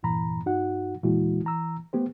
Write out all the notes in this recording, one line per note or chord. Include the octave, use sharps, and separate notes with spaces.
E2 G2 A#2 E3 A#5 B5
G2 D#4 F#4 F#5
D#2 A#2 E3 G#3 E4 F#4
E3 A#5 E6
A3 B3 G4 C5